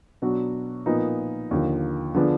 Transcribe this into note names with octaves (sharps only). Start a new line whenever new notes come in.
B2 F#3 D4 F#4
A#2 F3 B3 D#4 A#4
D#2 D3 F3
D3 F3 B3 D4 G#4